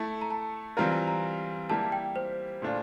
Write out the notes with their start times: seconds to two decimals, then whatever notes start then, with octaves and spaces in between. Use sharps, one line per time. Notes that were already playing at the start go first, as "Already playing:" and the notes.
Already playing: A3 E4 A4 A5
0.21 A#5
0.30 A5
0.77 E3 G3 C4 F4 A#4 A#5
0.92 A#5
1.08 A#5
1.70 G3 A#3 E4 G4 A5
1.92 G5
2.16 C5
2.62 A#2 A3 D4 F4